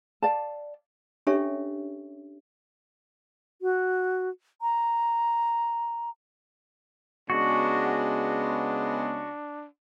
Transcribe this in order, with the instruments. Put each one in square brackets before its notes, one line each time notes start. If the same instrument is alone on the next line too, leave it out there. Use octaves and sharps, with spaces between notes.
[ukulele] D5 F5 A5
[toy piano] C#4 D4 G4 A4 C#5 E5
[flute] F#4
A#5
[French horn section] C#3 G#3 B3 [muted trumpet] D4 [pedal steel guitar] F#4